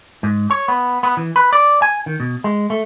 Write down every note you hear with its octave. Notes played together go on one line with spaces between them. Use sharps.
G#2
C#5
B3
B3
E3
B4
D5
G#5
D#3
B2
G#3
A3